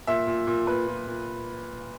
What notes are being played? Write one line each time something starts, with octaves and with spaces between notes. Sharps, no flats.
A#2 E5
A#2
A#2
A#2 B4
A#2
A#2